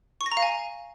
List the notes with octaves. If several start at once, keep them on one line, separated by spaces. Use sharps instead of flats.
C#6
A#6
A#5
F5
G#5